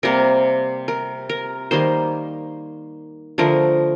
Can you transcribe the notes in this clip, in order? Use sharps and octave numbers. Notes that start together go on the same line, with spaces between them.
C3 G3 A#3 A#4
A#4
A#4
D#3 G3 A#3 C5
D3 F3 A3 A#4